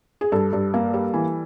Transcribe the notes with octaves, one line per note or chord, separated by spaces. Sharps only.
G#4
G2 A4
G2
A#3
G3
E3